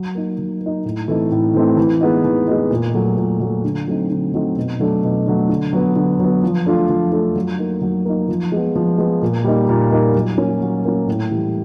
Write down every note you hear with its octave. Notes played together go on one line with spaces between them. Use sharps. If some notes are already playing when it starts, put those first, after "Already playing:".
Already playing: F#3
A#3 D#4
F#3
A#3
D#4
A2
E3 A3 C4 D#4
A2
E3 A3 C4 D#4
E3
G#3 B3 D#4
E3
G#3 B3 D#4
A#2
F#3 A3
A#2
F#3 A3
D3
F#3 A3 C4 D#4
D3
F#3 A3 C4 D#4
B2
F#3 A3 D4
B2
F#3 A3 D4
D3
F#3 B3
D3
F#3 B3
F3
A3 D4 F4
F3
A3 D4 F4
F#3
A#3 D#4
F#3
A#3 D#4
F3
G#3 B3
F3
G#3 B3
A#2
G3 A#3 D#4
A#2
G3 A#3 D#4
F#3
A#3 C#4
F#3
A#3 C#4
A2
E3 G3